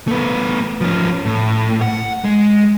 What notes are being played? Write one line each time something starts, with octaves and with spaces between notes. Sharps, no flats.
A3 B3
F3 C#4
A2
F#5
G#3